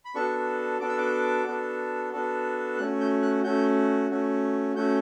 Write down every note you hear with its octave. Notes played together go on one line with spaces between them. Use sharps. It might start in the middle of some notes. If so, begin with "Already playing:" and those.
B5
B3 D4 F#4 A4 C#6
B3 D4 F#4 A4 D6
E6
D6
B3 D4 F#4 A4
B3 D4 F#4 A4
A3 C#4 F#4 F#6
G6
F#6
A3 C#4 F#4 G6
A3 C#4 F#4
A3 C#4 F#4 G6